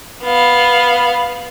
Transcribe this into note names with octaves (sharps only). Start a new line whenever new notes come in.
B3 F5